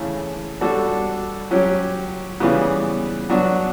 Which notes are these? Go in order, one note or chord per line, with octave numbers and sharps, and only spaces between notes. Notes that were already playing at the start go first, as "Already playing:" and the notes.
Already playing: C#3 E3 A3
G3 D4 F#4 A4
F#3 C#4 G4
C#3 E3 G3 B3
F#3 B3 D4 F#4